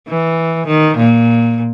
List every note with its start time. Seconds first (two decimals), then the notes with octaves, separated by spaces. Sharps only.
0.08 E3
0.67 D#3
0.97 A#2